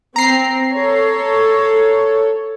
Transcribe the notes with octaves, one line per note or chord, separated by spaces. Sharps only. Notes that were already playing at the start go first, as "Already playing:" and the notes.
C4 A#5 C7
A4 C#5